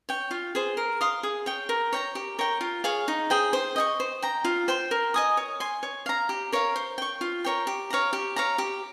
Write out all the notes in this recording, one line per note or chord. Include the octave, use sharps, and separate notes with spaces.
C#5 G5
F4
G#4 C5
A#4
F5 C6 D#6
G#4
C#5 G5
A#4
C#5 G5 A#5
G4
A#4 C#5 G5
F4
G#4 C#5 F5
D#4
G#4 C5 G5
C5
D#5 G5 C#6
C5
G5 A#5
F4
C5 G5 C6
A#4
D#5 G#5 D#6
C#5
G#5 C6
C#5
F5 A#5
G4
A#4 C#5 F5
C5
G5 C#6
F4
A#4 C#5 G5
G4
C#5 F5 A#5
G4
C#5 F5 A#5
G4